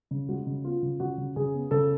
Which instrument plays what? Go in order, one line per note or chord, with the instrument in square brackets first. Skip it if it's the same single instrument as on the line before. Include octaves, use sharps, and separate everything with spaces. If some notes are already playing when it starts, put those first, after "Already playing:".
[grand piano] C#3
G#3 F#4
C#3
B3 F4
C#3
C#3 F#4
C#3
C#3 G#4
B3
C#3 A4